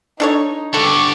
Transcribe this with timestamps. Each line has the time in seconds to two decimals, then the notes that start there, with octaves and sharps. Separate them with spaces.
0.20 D4 D#4 A4 C#5
0.74 G2 D3 A4 C#6 D6